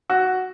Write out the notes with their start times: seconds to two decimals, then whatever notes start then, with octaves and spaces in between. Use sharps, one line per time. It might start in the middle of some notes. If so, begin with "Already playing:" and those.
0.10 F#4